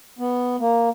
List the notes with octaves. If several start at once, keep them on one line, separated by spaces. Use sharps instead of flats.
B3
A#3